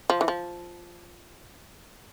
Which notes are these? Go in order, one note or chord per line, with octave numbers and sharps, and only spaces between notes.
F3
E3
F3